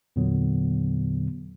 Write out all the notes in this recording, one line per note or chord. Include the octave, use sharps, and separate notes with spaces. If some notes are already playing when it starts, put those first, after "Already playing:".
E2 A#2 D3 F#3 B3